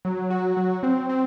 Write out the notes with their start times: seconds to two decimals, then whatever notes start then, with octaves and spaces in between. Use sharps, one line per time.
0.05 F#3
0.30 F#4
0.57 F#3
0.83 C4
1.09 C4